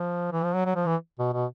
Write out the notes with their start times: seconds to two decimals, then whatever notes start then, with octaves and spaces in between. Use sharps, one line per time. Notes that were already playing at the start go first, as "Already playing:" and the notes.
Already playing: F3
0.32 E3
0.44 F3
0.54 F#3
0.65 F#3
0.76 F3
0.86 E3
1.19 B2
1.33 B2